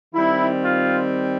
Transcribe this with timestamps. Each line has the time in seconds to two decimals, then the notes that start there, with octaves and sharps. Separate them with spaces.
0.14 D#3 G3 C4 E4
0.63 F4